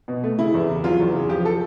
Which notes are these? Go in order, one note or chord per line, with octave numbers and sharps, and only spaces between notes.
B2
A3
C#3 E4
E2
C#3
F#3 F4
E2
C#3
F3 G4
A4